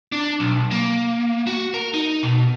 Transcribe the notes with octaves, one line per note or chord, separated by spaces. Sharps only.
D4
B1
A#3
F#4
A#4
D#4
B2